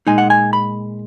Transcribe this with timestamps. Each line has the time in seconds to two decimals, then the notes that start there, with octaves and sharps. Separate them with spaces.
0.07 A#2 G#3 D#4 G#5
0.18 F#5
0.30 G#5
0.53 B5